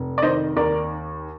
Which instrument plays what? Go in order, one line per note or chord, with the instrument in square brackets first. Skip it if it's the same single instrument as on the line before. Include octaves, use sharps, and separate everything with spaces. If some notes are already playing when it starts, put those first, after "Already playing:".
Already playing: [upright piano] F1
D5
D#3 C5 D#5
D#2 A#4 D5